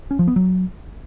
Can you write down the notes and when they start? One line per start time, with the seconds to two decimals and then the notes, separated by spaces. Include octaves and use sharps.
0.11 C#4
0.19 F3
0.28 B3
0.36 F#3